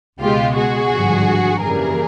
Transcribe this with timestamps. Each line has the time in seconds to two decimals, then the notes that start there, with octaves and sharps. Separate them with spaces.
0.20 C#2 B2 G#3 F4 G4
0.55 F#4 G#4
0.91 G#1 G2 D3 F3
1.61 F#2 C#3 E3 G3 A#3 G#4 A#4